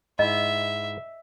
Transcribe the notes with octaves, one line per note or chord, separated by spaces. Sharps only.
G#2 E4 D#5 E5